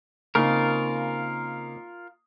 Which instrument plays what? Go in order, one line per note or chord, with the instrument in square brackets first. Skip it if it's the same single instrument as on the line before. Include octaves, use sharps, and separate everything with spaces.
[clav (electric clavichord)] C#3 [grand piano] A#3 C4 D#4 [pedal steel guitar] F4 A#4